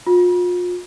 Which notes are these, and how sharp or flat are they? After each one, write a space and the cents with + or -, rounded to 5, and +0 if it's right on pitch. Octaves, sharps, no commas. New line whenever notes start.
F4 +35